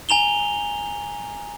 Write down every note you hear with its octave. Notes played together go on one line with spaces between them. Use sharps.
G#5 A#5 F7 G7